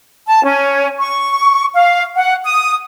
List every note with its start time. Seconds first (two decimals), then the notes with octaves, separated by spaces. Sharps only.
0.27 A5
0.43 C#4
0.99 C#6
1.75 F5
2.16 F#5
2.45 D#6